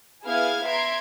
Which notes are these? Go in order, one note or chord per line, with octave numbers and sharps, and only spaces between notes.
B3 E4 G#4 F5 F6 G#6
E5 A#5 C6 G#6 D7